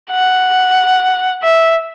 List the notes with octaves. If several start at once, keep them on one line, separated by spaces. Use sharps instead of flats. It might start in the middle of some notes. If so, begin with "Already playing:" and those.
F#5
E5